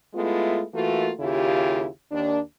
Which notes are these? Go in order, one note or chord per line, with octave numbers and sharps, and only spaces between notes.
G#3 A3 B3 E4 F4
E3 A3 A#3 F4 F#4
D#2 C#3 E4 F4 G4
D#2 D4